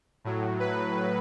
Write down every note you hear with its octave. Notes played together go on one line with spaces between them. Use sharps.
A2 F#3
B4